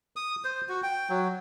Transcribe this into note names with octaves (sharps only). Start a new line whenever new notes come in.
D#6
C5
F#4
G5
F#3